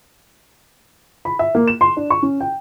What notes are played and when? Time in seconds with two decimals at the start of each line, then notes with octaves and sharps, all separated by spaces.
1.25 B5
1.39 E5
1.55 A#3
1.68 E7
1.81 C6
1.97 D4
2.10 C#6
2.22 C#4
2.41 G5